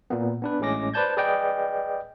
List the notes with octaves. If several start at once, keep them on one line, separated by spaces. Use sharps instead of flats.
A#2 A#3 B3
B3 D4 B4
A1 A2 G#3 C#4 D6 A#6
B4 C5 D5 A5 G6 G#6
G#4 B4 D5 D#5 G5